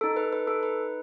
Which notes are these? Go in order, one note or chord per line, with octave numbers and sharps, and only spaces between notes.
D#4 A4
B4
B4
A4
B4